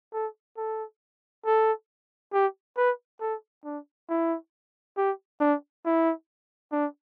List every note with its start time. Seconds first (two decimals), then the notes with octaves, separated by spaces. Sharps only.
0.13 A4
0.57 A4
1.46 A4
2.33 G4
2.77 B4
3.21 A4
3.65 D4
4.09 E4
4.98 G4
5.40 D4
5.85 E4
6.72 D4